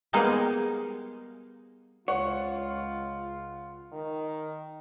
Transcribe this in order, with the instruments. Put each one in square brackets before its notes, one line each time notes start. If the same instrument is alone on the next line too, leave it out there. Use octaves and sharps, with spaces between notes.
[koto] G3 G#3 A#3 B3 D#4 G#4
[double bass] C#2 [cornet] F4 [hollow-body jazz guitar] C#5 [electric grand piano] F#5
[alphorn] D#3